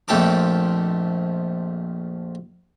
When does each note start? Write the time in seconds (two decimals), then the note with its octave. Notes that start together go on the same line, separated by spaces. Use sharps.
0.08 A#1 F2 A3 G4 A4 D6